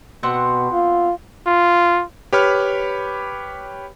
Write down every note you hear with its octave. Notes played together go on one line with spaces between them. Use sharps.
B2 B3 C4 F#5
F4
F4
G4 B4 C#5 B5 F6